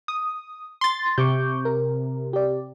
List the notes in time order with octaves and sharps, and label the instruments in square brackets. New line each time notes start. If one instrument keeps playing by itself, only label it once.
[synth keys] D#6
C6 A6
[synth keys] C3 [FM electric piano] C#6 D6 G6
[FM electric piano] A#4
G4 D5